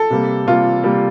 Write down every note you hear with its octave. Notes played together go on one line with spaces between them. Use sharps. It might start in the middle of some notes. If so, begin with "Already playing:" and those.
Already playing: A4
C3 G3 A#3
C3 G3 A#3 F4
C3 G3 A#3